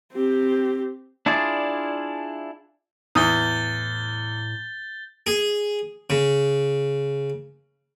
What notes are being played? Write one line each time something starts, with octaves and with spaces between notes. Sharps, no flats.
C4 G4
D4 E4 F4 G#4 D5
E2 A2 D#6 G6 A6 G7
G#4
C#3